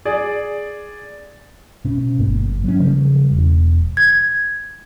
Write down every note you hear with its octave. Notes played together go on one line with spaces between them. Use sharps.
G#4 D5
B2 C#4
G1 A#3
F#3 C#4
C#3 F3 G3
E1
G#6